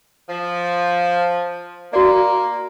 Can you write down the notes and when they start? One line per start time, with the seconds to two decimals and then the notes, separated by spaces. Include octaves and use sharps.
0.30 F3
1.93 A#3 F#4 D5